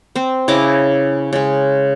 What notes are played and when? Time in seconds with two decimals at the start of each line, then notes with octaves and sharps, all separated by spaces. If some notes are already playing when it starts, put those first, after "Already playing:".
0.16 C4 C5
0.48 C#3 E4 D#5 D6
1.33 C#3 G#3